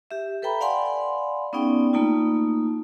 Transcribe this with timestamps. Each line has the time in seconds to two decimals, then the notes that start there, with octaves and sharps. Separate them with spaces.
0.11 G4 E5
0.42 A4 B4 E5 G5 A#5 B5
0.61 D5 F5 F#5 G#5 B5 C6
1.53 B3 C#4 D#4 G#4 D5 G5
1.93 A3 A#3 D#4 F4